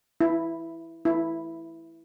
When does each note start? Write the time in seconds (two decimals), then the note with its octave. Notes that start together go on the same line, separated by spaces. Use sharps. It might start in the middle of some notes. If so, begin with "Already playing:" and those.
0.21 E4
1.05 E4